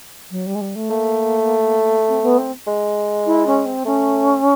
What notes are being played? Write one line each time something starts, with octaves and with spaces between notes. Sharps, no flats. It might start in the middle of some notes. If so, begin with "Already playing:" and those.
F#3
G3
G#3
G3
A3
A3 A#3
C4
B3
C4
G#3
E4
C#4
C4
A3 C#4